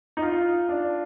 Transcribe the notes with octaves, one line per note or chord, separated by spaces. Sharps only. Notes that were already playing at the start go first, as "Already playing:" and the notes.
D#4
F4
D4